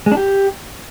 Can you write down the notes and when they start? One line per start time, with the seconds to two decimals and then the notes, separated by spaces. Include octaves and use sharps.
0.06 G#3
0.12 D4
0.17 G4